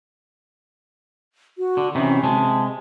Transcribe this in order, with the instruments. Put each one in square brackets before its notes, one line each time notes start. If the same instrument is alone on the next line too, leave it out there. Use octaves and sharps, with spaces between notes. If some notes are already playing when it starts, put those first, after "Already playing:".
[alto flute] F#4
[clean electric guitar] D3
[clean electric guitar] C3 D#3 E3 [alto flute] C#4
[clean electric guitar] C3 G#3 [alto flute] A5